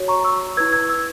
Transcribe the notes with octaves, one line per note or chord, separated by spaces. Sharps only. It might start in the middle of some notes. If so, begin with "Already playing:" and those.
Already playing: F#4 C#5
A#5 C#6
C#6 E6
E4 B4 E6 G#6
E6 G#6
E6 G#6